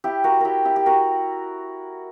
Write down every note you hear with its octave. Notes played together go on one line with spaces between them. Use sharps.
E4 G4
F#4 A#4
E4 G4 A#4
E4 G4
G4
F#4 A#4